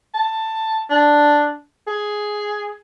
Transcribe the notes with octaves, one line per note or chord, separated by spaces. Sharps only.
A5
D4
G#4